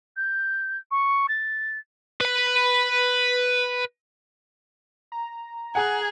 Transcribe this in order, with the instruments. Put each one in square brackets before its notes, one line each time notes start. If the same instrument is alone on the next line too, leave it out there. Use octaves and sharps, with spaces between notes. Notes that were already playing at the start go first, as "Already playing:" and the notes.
[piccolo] G6
C#6
A6
[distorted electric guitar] B4 B5
[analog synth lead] A#5
[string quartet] G#4 [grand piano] F#5 G#5 F#6